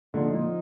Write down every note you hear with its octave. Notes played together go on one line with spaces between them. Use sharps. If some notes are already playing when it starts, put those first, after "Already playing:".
A#2 D3 F3 C4 D#4
A#2